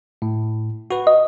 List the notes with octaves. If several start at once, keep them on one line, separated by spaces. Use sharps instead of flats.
A2
F#4 B4
D#5